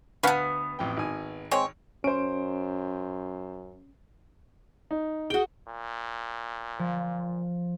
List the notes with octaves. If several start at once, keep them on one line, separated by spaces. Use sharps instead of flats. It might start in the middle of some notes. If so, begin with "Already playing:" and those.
D2 B3 C#4 B4 F5 F#5
A1 F2 G5
G#1 D#3 G#5
G#3 C4 C#5
F#2 C#4 C5 D7
D#4
F#4 G#4 G5 G7
A#2
F3